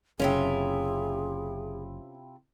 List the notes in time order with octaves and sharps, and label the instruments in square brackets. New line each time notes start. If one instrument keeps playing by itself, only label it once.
[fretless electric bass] F#1 [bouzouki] C3 E4 F4 [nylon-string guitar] C#4 [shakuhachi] G#4